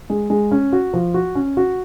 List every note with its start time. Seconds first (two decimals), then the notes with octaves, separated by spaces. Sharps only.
0.10 G#3
0.30 G#3
0.51 C#4
0.72 F#4
0.94 F3
1.14 F#4
1.35 C#4
1.57 F#4